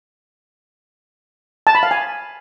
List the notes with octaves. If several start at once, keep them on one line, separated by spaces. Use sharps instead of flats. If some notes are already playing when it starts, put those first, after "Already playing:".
A5
B5
F5
G#5